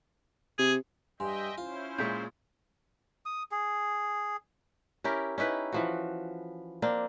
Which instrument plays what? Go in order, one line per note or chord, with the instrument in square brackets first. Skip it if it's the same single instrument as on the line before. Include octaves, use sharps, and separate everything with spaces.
[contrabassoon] C3 [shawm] G#4
[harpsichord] G2 [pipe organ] D#5 E5 G5 [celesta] G#5 C6
[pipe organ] C#4 E4 C5 [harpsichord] F4
[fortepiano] A#2 G#3 C#6 [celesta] G6 B6
[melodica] D#6
G#4
[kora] C#4 E4 G4 A#4
C#4 D#4 E4 B4
E3 F3 F#4
A#3 C4 D4